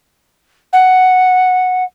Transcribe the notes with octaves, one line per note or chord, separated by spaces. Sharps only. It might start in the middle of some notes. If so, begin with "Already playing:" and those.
F#5